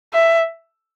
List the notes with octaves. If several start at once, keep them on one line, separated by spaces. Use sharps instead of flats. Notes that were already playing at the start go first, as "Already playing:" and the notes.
E5